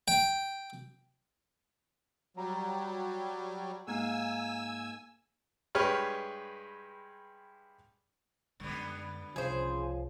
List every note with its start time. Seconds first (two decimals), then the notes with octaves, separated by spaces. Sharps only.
0.08 G5
2.37 F#3 G3 A#5
3.87 G#2 A#3 F5 G#5 E6
5.75 G2 G#3 G4 B4 C#5 F6
8.60 F#2 D3 G3 G#3 B3
9.36 C2 C#3 F3 G#4 C5